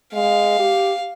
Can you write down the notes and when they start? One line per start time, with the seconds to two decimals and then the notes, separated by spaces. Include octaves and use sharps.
0.13 G#3 F5
0.59 G4